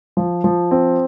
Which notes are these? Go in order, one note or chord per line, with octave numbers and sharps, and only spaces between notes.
F3
F3
C4